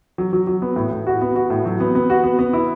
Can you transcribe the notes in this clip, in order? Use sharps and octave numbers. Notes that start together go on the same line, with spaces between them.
F#3
F#3
F#3
B3
A2
A2
F#4
B3
F#4
A2
F#3
B3
B3
F#4
B3
B3
E4